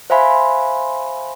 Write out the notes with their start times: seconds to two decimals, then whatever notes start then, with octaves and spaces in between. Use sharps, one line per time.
0.10 C5 E5 F5 G#5 B5 C6